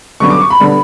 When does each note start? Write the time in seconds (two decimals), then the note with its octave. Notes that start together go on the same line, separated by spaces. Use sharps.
0.20 F#2 D3 G3 B3 C#6
0.30 D6
0.41 C#6
0.50 B5
0.60 D3 G3 B3